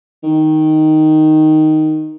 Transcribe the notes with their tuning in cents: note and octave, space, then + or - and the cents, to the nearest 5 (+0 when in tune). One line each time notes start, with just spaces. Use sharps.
D#3 +0